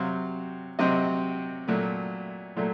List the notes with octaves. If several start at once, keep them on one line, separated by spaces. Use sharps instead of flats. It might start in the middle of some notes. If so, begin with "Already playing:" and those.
Already playing: C3 F#3 C4 F5
C3 F#3 C4 D#5
A#2 F#3 A3
A#2 F#3 A3